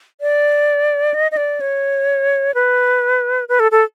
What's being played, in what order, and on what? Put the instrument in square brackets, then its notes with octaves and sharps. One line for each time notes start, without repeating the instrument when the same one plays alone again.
[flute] D5
D#5
D#5
D5
C#5
B4
B4
A4
A4